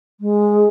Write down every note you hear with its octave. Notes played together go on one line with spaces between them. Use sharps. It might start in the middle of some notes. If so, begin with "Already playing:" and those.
G#3